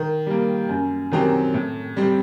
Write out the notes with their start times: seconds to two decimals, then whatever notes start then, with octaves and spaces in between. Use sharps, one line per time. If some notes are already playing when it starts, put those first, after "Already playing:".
Already playing: D#3
0.26 G3 A#3
0.69 F#2
1.12 D#3 F#3 C4 G4
1.54 A2
1.97 G3 C4